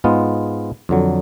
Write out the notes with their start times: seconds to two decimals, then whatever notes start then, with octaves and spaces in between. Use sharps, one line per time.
0.04 G#2 G#3 B3 F4
0.89 F2 D3 F#3